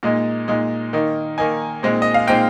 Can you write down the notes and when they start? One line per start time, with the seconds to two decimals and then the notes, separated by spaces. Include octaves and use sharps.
0.03 A#2 G#3 D#4
0.48 A#2 G#3 D#4
0.93 D#3 A#3 D#4
1.38 D#3 A#3 D#4 G#5
1.83 A#2 G#3 C4 D#4
2.02 D#5
2.14 F5
2.27 A#2 G#3 C4 D#4 G5